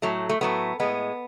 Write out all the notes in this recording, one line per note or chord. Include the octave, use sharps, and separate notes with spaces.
A2 F#3 A3
A3
A2 F#3 A3 B3
A2 G#3 B3